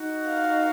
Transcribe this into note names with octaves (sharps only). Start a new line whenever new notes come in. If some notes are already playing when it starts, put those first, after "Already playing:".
Already playing: D#4 F#4
F5